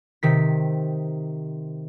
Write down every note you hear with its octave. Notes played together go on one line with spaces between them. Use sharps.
C3 D#3 B6